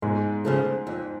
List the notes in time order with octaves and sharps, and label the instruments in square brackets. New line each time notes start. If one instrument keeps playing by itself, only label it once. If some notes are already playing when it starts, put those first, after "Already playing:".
[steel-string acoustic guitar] F2 [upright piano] G#2 G#3
[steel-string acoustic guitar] C#3 F3 A3
F2